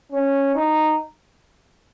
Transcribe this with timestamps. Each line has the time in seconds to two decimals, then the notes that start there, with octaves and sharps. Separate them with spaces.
0.12 C#4
0.55 D#4